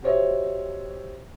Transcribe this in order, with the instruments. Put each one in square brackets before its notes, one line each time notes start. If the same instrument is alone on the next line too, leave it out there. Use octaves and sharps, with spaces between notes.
[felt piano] F#4 G4 C5 C#5 D#5 E5